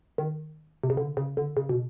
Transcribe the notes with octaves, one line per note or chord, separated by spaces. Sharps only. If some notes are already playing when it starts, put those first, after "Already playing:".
D#3
C3
C#3
D3
C#3
D3
C#3
B2